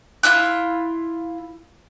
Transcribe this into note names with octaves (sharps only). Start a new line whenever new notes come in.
E4 F4 E6 F#6